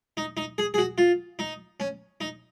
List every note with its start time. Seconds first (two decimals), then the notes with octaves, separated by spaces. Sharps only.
0.17 D#4
0.37 D#4
0.58 G#4
0.74 G#4
0.78 F#4
0.98 F4
1.39 D#4
1.80 C#4
2.21 D#4